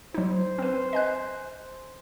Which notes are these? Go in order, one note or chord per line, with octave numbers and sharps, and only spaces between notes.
F#3 D#4 C5
C4 B4
D#5 G#5 F#6